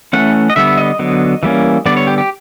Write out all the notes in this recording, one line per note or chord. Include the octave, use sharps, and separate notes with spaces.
E3 A3 C#4 F#5
D#5
D3 G3 B3 E5
D#5
D3 F#3 B3
E3 G3 A#3 C#4
D3 G3 B3 D5
C#5
G4
G4